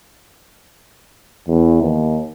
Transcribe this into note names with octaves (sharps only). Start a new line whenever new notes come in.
E2
D#2